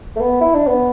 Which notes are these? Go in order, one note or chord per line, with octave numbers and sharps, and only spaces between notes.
A3
B3
E4
D4
B3